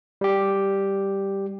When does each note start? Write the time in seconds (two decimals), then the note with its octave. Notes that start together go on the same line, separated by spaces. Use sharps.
0.21 G3 G4